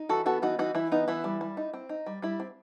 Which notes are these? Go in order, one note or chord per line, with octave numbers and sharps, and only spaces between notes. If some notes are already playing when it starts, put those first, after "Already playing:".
Already playing: D#4
E3 F#4 A4
B3 F#4 A4
E3 D#4 F#4
E3 D#4 F#4
E3 E4
B3 D#4
E3 E4
G3
G3
D#4
C4
D#4
G3
G3 E4
C4